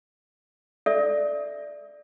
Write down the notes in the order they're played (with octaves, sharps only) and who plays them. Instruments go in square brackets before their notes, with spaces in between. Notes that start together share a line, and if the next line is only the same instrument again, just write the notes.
[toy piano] A4 D5 E5